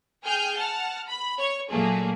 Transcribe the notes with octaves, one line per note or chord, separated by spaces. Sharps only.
G#4 G5 G#5 F6 G6
F#5 A5 F6
B5
C#5
A#2 F#3 A3 A#3 G#4